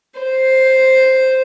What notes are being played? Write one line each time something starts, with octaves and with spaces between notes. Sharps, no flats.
C5